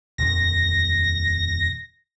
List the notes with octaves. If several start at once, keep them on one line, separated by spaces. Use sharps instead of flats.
D#1 F2 D#3 A#6